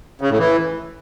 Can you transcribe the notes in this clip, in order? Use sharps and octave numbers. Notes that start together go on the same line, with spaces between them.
C#3
A2
E3